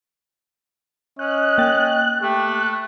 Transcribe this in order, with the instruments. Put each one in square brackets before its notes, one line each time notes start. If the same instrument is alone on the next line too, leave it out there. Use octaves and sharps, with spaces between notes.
[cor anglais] C#4 [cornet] D#5 [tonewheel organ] F#6
[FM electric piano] A#3 G5 A6
[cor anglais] A3 [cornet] G4